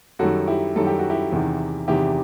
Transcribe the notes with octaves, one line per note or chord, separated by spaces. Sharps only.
F#2 D#3 G3 F#4 A4
E4 G4
F#2 D#3 G3 A4
G4
F#4
E4 G4
E2 C3 D#3
E2 C3 D#3 E4 G4